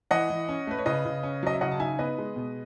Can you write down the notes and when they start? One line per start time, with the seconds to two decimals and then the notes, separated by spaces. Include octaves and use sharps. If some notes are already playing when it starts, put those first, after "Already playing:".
0.11 E3 D#5 F#5
0.30 E3
0.49 C#4
0.67 A3 B4
0.79 C#5
0.86 C#3 B4 D#5
1.05 C#3
1.23 C#4
1.43 F#3 D#5
1.54 E5
1.61 C#3 D#5 F#5
1.71 A5
1.80 D#4 E5 G#5
1.99 B3 B4 D#5
2.18 G#3
2.36 B2